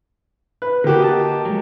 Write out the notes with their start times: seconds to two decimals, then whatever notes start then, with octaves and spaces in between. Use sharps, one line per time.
0.62 B4
0.84 D3 A#3 F#4 G4
1.00 D#5 G5 A5
1.45 F#3 G#3